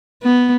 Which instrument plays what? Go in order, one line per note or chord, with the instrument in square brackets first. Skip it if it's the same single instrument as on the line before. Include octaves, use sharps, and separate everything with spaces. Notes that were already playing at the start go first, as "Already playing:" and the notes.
[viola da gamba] B3